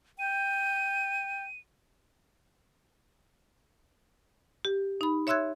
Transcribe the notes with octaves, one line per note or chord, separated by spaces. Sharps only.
G5 D#7
G4
D#4 B5
C#5 E5 C6 E6 F#6 G#6